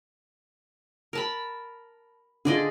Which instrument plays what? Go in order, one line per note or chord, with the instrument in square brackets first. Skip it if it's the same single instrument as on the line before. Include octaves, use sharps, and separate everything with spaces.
[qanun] A#4 A5 B5
[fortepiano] D3 F4 [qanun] G#4 D5 D#5